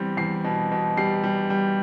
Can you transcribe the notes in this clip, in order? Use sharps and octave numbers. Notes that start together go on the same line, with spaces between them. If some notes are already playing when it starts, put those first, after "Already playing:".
Already playing: E2 G3 C4
E2 C7
B2
B2
G3 C7
G3
G3